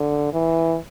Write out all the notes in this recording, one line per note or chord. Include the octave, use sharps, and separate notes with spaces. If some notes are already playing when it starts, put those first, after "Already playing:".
Already playing: D3
E3